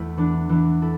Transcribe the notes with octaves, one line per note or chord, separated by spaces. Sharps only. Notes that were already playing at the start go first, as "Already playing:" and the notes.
Already playing: E2 A3 E4 B4
E3 B3 D4
E3 B3 D4
E4 A4